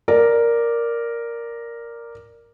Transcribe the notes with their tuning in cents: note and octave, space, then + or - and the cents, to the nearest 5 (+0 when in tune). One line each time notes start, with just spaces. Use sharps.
A#4 +0 D5 +0